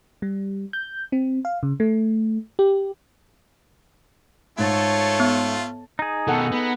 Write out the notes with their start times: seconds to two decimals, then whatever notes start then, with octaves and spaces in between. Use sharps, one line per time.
0.22 G3
0.73 G6
1.12 C4
1.45 F5
1.63 C#3
1.80 A3
2.59 G4
4.58 G#2 A3 F4 A4 C#5 A6
5.20 B3
5.99 D#4 G#4
6.27 B2 D#3 A4 F#5 A5
6.52 B3